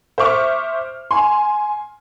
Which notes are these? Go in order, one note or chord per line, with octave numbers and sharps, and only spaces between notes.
C5 E5 C#6 D6 F6
G#5 C6